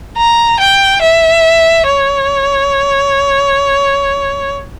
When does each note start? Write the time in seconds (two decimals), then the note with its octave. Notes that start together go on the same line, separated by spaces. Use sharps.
0.17 A#5
0.60 G5
1.02 E5
1.86 C#5